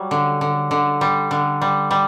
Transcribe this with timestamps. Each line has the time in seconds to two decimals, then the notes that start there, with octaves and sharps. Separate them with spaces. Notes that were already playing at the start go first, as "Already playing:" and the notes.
Already playing: F#3 G3
0.11 D3
0.41 D3
0.71 D3
1.01 G3
1.31 D3
1.61 G3
1.91 G3